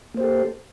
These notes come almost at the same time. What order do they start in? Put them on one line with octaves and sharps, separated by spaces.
A#3 C5 G4 A4